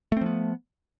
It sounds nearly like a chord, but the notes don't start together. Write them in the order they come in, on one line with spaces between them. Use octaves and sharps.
A3 C4 F3 B3